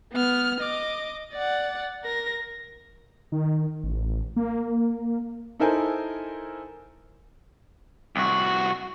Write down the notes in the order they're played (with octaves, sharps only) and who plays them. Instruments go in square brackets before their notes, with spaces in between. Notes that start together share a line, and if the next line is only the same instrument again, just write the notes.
[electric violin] B3 F6
D#5 D6
D5 F#5
A#4 A#6
[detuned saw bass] D#3
A1
A#3
[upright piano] D#4 E4 A4 A#4 C5 G#5
[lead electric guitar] C2 F#4